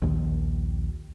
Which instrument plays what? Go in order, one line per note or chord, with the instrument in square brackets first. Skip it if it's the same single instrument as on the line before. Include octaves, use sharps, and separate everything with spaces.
[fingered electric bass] A#1 D#2 D#3